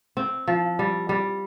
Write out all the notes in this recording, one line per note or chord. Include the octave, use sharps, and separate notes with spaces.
C4
F3
G3
G3